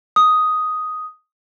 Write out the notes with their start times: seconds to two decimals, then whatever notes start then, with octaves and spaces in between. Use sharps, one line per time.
0.16 D#6